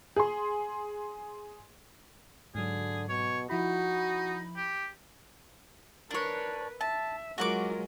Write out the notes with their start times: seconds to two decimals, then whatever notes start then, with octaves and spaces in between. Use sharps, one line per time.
0.16 G#4 C6
2.55 G#2 D3 F#3 G#4
3.09 B2 C#5
3.50 F3 D#4 E4 F#4 B5
4.56 G4
6.11 D4 A#4 B4 C#5
6.81 E5 A5
7.38 F#3 G#3 F4 F#4 A#4 F#5 D6